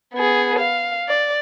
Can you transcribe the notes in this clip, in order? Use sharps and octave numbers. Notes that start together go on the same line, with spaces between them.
B3 G#4
F5
D5